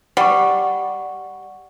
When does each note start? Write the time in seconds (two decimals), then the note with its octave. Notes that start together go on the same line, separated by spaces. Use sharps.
0.17 G3 F#5 C#6